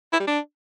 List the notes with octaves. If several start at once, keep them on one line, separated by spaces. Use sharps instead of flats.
E4
G3
D4